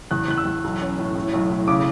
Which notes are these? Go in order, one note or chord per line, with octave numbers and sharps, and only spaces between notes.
E2 F#6
E2 F#6
E6
E2
B1
C#4
A2
A2
B1
A2
C#3 D6